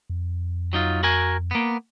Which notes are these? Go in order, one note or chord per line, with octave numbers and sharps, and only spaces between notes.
F2
F#3 D#4 F4
F#4 A#4 G#5
A#3 B3